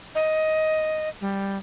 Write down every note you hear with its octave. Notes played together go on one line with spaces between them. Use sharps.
D#5
G3